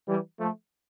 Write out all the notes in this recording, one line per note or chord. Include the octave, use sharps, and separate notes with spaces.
E3 G3
F3 A3